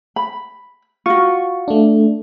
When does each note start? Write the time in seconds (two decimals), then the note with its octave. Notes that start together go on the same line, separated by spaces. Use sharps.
0.16 B5
1.06 F4 F#4 C#6
1.68 A3 D4